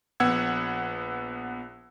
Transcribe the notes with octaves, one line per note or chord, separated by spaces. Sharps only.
A#1 B3 F#5 E6 G#6